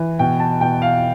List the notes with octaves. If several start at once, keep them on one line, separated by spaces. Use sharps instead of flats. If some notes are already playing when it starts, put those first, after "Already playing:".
Already playing: E3
B2 G5
A5
B2 G5
F5